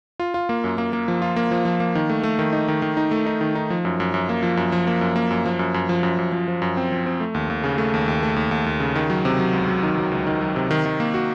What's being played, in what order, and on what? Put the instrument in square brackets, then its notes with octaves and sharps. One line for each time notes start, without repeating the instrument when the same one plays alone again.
[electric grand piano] F4
F4
A#3
F#2
A#3
A#3
F3
F4
A#3
F3
F3
A#3
D#3
A3
A3
D#3
D#4
D#3
D#3
D#4
A3
D#4
D#3
D#4
F3
F#2
F#2
F#2
A#3
F3
F#2
F3
A#3
F#2
A#3
F#2
F3
F#2
F#2
F3
F#2
F#2
F3
F3
F#2
C4
F3
C4
A3
D#2
D#2
C#3
A3
D#2
D#2
A3
D#2
D#2
D#2
C#3
D#3
F#3
C3
F#3
C#2
F#3
D#3
F#3
C#2
D#3
F#3
C3
D#3
D#3
A#3
F#4